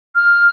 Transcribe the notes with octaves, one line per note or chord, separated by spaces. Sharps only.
F6